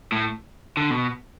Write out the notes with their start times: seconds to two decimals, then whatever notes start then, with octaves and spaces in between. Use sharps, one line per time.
0.12 A2
0.77 D3
0.90 B2